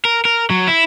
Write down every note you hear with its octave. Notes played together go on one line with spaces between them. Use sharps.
A#4
A#4
F#3
E4